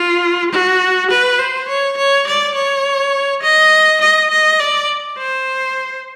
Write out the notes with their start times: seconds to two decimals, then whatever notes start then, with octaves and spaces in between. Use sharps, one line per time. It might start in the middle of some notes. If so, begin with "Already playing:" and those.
Already playing: F4
0.51 F#4
1.10 B4
1.39 C5
1.68 C#5
1.97 C#5
2.27 D5
2.55 C#5
3.42 D#5
4.01 D#5
4.31 D#5
4.60 D5
5.18 C5